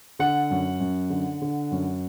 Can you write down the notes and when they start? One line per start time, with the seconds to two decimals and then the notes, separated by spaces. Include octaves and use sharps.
0.19 D3 F#5
0.50 F#2
0.80 F#2
1.10 D3
1.42 D3
1.71 F#2